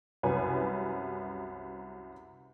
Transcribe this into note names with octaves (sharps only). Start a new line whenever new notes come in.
C2 F#2 B4 G#5